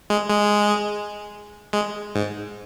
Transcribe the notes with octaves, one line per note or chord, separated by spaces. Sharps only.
G#3
G#3
G#3
G#2